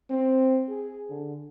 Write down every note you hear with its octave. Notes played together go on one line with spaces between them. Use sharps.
C4
G#4
D3